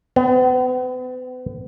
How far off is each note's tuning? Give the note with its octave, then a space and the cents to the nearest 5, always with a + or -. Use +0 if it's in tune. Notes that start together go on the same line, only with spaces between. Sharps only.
B3 +40